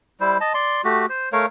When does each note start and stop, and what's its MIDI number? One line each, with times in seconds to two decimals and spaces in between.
0.20 0.37 55
0.20 0.37 64
0.20 0.37 72
0.41 0.53 75
0.41 0.53 81
0.54 0.81 74
0.54 0.81 84
0.84 1.06 57
0.84 1.06 66
0.84 1.06 67
1.09 1.29 72
1.33 1.46 57
1.33 1.46 70
1.33 1.46 73
1.33 1.46 77